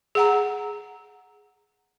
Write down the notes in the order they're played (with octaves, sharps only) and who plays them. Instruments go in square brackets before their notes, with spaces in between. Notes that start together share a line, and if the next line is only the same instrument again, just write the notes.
[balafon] G#4 F#5 A#5